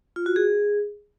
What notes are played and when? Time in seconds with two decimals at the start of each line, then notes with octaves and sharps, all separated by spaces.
0.16 F4
0.26 F#4
0.36 G#4